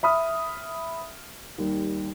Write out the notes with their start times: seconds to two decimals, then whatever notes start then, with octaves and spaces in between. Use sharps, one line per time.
0.03 E5 B5 D#6 F6
1.58 D#2 G3